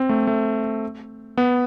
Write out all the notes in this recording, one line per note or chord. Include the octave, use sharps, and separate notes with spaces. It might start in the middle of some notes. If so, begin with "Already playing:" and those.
Already playing: C4
A3
A3
B3